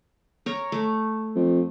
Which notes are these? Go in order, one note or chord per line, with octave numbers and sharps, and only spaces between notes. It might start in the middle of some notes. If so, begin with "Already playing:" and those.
A#4 C#5
A3
F2